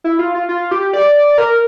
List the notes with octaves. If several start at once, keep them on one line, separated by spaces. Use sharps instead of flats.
E4
F4
F4
F4
G4
D5
A#4